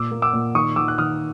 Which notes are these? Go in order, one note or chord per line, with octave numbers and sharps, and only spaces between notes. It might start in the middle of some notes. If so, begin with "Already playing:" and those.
Already playing: A#2 D6 E6
A#3
D6 E6
A#2
D#3 C#6 D#6
D#3 D6 E6
F#6
D#3 D#6 F6